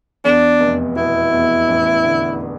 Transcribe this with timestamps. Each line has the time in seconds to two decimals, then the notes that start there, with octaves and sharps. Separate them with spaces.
0.25 E2 D4
0.60 F1
0.96 B2 E4
1.33 E2
1.69 A1
2.05 D3